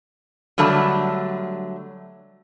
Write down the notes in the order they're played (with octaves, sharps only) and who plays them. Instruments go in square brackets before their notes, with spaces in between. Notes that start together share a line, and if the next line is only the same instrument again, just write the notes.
[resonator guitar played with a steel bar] D3 F#3 G3 A3 A5